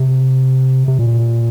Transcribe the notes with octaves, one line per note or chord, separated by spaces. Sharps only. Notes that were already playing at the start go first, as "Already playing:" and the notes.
Already playing: C3
C3
A#2